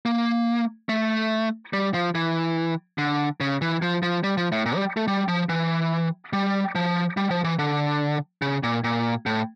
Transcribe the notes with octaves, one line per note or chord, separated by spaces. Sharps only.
A#3
A3
G3
F3
E3
D3
C#3
E3
F3
F3
G3
F3
A2
A#2
G3
A3
G3
F3
E3
G3
F3
G3
F3
E3
D3
C#3
A#2
A#2
A2